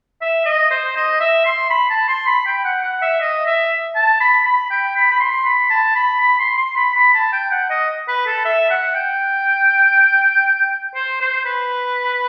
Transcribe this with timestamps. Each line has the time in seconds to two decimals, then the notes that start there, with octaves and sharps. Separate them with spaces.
0.21 E5
0.45 D#5
0.70 C5
0.96 D#5
1.20 E5
1.46 C6
1.70 B5
1.90 A5
2.08 C6
2.27 B5
2.46 G5
2.64 F#5
2.83 F#5
3.01 E5
3.21 D#5
3.46 E5
3.95 A5
4.20 B5
4.45 B5
4.70 G5
4.96 B5
5.11 B5
5.20 C6
5.45 B5
5.70 A5
5.95 B5
6.20 B5
6.39 C6
6.57 C6
6.76 B5
6.95 B5
7.14 A5
7.32 G5
7.51 F#5
7.70 D#5
8.08 B4
8.26 A4
8.45 E5
8.70 F#5
8.95 G5
10.95 C5
11.20 C5
11.45 B4